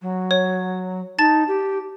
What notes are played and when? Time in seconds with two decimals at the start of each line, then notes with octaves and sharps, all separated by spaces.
0.02 F#3
0.31 C#5
1.19 D#4 A5 A6
1.48 G4